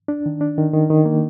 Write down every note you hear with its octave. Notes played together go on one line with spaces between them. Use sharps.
D4
D#3
D4
D#3
D#3
D#3
A#3